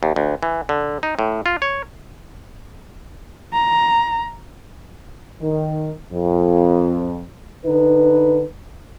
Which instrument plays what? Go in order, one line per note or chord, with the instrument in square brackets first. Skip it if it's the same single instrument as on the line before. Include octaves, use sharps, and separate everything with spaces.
[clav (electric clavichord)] D#2
D2
E3
D3
D#4
A2
F4
C#5
[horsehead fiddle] A#5
[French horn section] D#3
F2
D3 D#4 B4